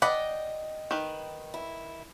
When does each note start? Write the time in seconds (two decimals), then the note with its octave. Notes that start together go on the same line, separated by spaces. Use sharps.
0.02 D5 D#5 F#5 G5 B5
0.91 D#3 B4
1.54 E4